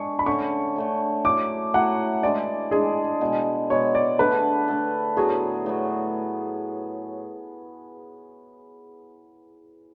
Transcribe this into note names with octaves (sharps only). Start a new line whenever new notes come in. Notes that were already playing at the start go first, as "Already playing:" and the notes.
Already playing: G#3 D4 G#4 C#6
B5
D3 A3 C#4 C#6
D3 A3 C#4
F#3 A3 E4 D6
F#3 A3 E4 F#5
E3 G#3 D4 D5
E3 G#3 D4 G#4
B2 G#3 B3
B2 G#3 B3 C#5
D5
D3 A3 D4 A4 B4
D3 A3 D4 A4
A2 F#3 B3 F#4 G#4
A2 F#3 B3 F#4